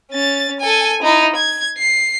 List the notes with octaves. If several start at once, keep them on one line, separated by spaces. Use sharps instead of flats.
C#4 A6
A4 G#5
D#4 E4
G#6
C7